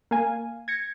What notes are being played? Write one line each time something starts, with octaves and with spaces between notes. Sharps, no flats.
A#3 F5 G#5
G#6 A#6 C#7